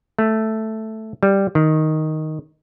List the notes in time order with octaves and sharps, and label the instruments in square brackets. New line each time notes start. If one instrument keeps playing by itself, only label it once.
[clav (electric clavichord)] A3
G3
D#3